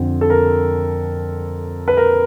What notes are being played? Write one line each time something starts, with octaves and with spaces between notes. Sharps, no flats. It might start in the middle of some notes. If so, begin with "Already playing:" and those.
Already playing: F2 D3 F3
A4
A#4
B4
A#4